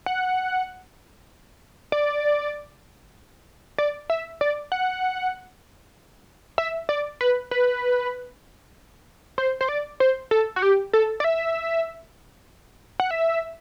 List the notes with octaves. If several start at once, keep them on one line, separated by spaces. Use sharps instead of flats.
F#5
D5
D5
E5
D5
F#5
E5
D5
B4
B4
C5
C5
D5
C5
A4
F#4
G4
A4
D5
E5
F#5
E5